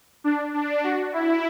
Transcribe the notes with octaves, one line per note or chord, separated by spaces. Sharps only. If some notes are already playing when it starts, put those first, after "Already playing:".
D4
D4
F#4
E4